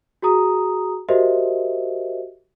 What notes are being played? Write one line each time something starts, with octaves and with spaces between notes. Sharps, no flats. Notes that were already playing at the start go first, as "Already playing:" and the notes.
F#4 G#4 A#5 D#6
F#4 G4 A#4 C5 D#5 E5